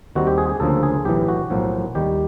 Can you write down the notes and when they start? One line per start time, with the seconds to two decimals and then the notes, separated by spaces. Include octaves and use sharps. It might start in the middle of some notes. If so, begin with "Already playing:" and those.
0.15 D#2 D#3 G3 C4 F#4
0.27 G4
0.38 G#4
0.49 G#4
0.60 D2 C#3 F3 A#3 A4
0.83 G#4
1.05 B1 A2 E3 G4
1.28 F#4
1.50 B1 A2 F3 A#3
1.95 D#2 D#3 G3 G4